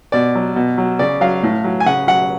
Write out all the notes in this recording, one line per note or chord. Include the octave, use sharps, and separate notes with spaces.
B2 D5
F#3
B2
F#3
C#3 D5
F#3 F5
A2
F#3
G#5
C#3 F#5
F#3 F#5